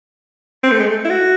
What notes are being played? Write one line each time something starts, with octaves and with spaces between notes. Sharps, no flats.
C4
A3
G#3
A3
E4
F#4